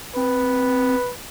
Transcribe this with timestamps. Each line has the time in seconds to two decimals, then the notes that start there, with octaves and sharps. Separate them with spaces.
0.16 C4 B4